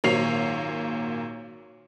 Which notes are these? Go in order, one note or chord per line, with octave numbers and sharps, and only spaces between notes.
G#1 A#2 F#3 C#5 C7 F7